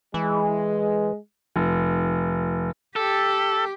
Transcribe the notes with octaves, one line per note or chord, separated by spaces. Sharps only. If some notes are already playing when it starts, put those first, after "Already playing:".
E3 G#3
F1
G4 A4